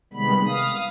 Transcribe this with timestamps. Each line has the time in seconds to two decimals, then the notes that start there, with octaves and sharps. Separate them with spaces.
0.13 C3 D#3 G3 G#3 B3 B5
0.47 F5 D#6